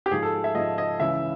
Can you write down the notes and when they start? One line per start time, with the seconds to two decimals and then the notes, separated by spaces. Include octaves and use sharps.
0.06 G4
0.11 G#2 F3 G#4
0.23 A4
0.44 E5
0.55 G#2 F3 D#5
0.78 D#5
1.00 C#2 C#3 E3 E5